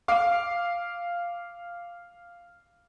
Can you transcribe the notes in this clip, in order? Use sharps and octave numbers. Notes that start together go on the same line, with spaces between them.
F5 D6